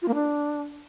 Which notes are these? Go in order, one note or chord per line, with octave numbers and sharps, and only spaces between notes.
F4
A#3
D4